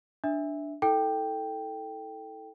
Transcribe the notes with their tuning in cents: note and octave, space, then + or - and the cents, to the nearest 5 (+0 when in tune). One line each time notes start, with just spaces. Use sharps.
D4 +0 E5 -10
E4 -35 A4 +0 G5 +0